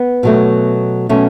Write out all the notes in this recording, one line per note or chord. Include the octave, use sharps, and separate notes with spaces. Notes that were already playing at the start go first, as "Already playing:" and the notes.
Already playing: B3
B2 F#3 A3
B2 F#3 A3 C#4